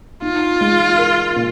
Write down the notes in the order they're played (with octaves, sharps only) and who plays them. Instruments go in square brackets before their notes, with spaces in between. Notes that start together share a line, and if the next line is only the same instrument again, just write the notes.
[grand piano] D#4 [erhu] F4
[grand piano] G#3
A#4
A#2